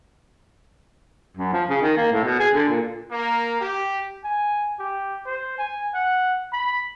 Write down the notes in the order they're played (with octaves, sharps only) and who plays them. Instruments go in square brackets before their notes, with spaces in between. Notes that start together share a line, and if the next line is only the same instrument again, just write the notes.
[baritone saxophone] F#2
F3
C#3
D#3
A#3
A2
B2
G#4
D3
A#2
[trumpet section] A#3
G4
[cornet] G#5
G4
C5
G#5
F#5
B5